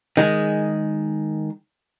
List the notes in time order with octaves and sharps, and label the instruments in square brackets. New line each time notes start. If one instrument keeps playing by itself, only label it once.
[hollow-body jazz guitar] D#3 G#3 G#4